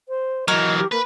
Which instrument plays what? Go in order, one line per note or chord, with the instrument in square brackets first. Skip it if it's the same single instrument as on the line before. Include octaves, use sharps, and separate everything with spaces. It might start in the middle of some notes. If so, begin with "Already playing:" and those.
[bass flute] C5
[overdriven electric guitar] E3 F#3 [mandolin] A#4 [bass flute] D#5
[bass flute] G4
[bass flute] A#3 [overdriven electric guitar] B4